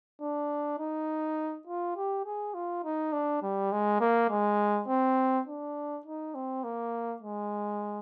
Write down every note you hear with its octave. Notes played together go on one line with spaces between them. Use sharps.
D4
D#4
F4
G4
G#4
F4
D#4
D4
G3
G#3
A#3
G#3
C4
D4
D#4
C4
A#3
G#3